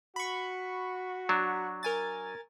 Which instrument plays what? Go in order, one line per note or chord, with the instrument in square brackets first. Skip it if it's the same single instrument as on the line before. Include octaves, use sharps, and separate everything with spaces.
[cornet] F#4 [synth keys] B5 C#6
[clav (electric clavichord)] F#3 D4
[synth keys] A#4 G#5 A6